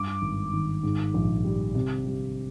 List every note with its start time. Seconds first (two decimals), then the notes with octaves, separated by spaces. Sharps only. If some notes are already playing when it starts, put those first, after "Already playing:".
Already playing: G2 D6
0.22 G#1
0.53 D#3
0.83 G#2
1.14 A#1
1.44 G3
1.75 C3
2.06 G3